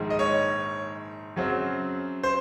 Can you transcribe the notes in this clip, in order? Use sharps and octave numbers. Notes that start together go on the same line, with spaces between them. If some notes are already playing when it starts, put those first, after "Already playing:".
Already playing: A#1 G#2 D#3 G#3
D#5
C#5
F#2 C#3 F#3 C4
C5